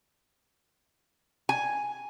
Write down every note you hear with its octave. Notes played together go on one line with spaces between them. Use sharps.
G#5